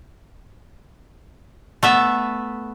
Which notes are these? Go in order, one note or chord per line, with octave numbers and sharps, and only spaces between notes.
A3 B3 E5